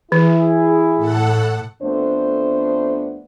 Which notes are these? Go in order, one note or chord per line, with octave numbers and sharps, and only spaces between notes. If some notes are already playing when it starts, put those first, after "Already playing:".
E3 E4 G#4
A2 A4 F#5
F2 A3 B3 D4 C5